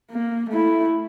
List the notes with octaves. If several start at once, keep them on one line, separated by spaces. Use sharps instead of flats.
A#3
A3 E4